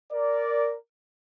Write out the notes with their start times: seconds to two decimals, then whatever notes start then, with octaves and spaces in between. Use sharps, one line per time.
0.12 A#4 D5